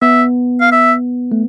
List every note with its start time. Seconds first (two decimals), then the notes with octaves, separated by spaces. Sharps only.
0.02 B3 E5
0.61 F5
0.72 E5
1.32 A3